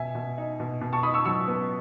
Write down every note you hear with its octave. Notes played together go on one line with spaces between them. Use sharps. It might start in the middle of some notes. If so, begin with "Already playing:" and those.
Already playing: B2 E5 G#5
B2
D#4
B2
B2
A5 C#6
D#4 B5 D#6
C#6 E6
F#3 C#6 E6
B3